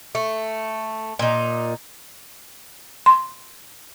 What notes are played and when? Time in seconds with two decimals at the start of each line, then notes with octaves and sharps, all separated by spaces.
0.15 A3
1.19 A#2 D#4
3.06 C6